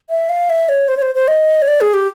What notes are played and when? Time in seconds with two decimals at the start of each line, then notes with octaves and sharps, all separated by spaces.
0.10 E5
0.29 F5
0.50 E5
0.69 C#5
0.88 C5
0.97 C#5
1.02 C5
1.15 C5
1.28 D#5
1.62 C#5
1.68 D5
1.81 G#4
1.94 G4